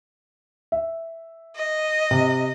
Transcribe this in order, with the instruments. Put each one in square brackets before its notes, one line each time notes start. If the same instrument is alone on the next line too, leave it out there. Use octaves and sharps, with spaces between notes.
[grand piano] E5
[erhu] D#5
[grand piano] C3